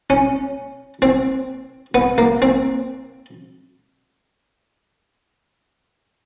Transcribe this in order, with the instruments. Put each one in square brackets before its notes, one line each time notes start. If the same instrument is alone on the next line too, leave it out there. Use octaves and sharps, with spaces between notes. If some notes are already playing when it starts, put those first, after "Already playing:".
[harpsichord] C#4
C4
B3
A#3
C4